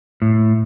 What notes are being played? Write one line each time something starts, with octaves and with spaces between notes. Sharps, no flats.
A2